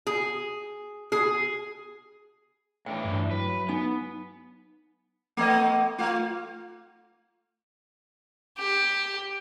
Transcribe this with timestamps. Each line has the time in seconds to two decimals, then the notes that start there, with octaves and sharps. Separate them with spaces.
0.07 G#4
1.12 G#4
2.86 A2 E3 D4 G5
3.05 G2
3.31 F#3 B4
3.69 B3 D#4 G#5
5.37 A3 B3 D#5
5.98 A3 F4
8.59 G4